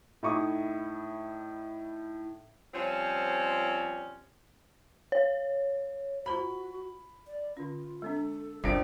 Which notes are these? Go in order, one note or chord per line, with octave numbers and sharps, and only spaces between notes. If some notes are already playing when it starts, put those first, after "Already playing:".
A2 D#4 E4 C#6 D#6
F3 G3 C4 C#4
C#5
F4 F#4 C5 A#5 B5
D5
D3 C#4 F4
G#3 C4 D4 A4
G#1 C#2 C4 D4 C5 D5 D7